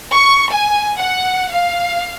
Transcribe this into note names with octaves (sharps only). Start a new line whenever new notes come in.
C#6
G#5
F#5
F5